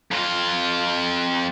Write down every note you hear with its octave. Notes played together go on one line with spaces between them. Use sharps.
F2 F4